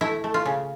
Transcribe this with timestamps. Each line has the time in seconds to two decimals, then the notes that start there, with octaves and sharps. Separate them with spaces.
0.01 A3 E4
0.24 A3
0.34 F4
0.46 C#3